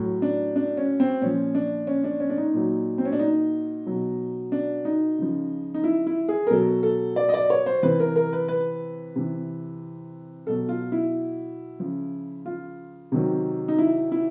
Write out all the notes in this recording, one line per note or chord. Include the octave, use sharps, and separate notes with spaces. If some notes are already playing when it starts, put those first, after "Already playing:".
Already playing: A2 F#3
D4
D4
C#4
C4
A#2 F3 C#4
D4
C#4
D4
C#4
D4
D#4
A#2 F#3
C4
C#4
D4
D#4
B2 F#3
D4
D#4
C#3 F3
D#4
E4
E4
G#4
A#4
B2 F#3 A4
A4
D5
D#5
D5
C#5
C5
C3 E3 B4
A#4
A#4
B4
B4
C3 E3
B2 F#3 A4
F4
E4
C#3 F3
F4
C3 D#3 F#3
D#4
E4
E4